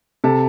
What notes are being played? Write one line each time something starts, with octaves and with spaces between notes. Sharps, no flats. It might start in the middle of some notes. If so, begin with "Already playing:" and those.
C3 A4